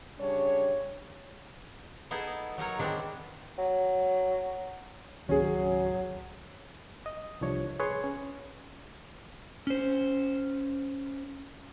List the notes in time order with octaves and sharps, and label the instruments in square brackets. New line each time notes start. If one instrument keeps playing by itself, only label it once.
[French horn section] C#3 G3 D4 C#5
[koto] B3 D#4 E4 G#4 A4
F#3 D#4 A#4 C#5
D#3 G#3 B3 C4 D4
[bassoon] F#3
[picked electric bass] G#1 C#2 D#3 [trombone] F#3 [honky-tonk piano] C#4 G#4
[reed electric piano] D#5
C2 F3 D4 C#5
G#4 B4 C#5 C6
C#4
[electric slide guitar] C#4 C5